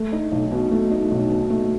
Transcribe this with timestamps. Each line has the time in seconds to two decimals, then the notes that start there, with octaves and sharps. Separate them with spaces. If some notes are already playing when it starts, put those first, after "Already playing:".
Already playing: A3
0.12 D#4
0.32 B1
0.52 B2
0.71 A3
0.91 D#4
1.11 B1
1.30 B2
1.50 A3